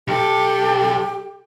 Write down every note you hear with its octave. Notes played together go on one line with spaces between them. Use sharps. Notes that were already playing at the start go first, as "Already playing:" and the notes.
B1 G4 A4